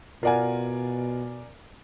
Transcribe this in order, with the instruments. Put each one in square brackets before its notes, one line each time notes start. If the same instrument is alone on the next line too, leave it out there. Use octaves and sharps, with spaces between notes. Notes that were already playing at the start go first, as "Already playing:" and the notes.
[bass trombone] B2 [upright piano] F4 F#5 [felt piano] A#4 D5 G#5